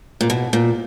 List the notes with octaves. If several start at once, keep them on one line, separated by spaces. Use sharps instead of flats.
A#2
B2
A#2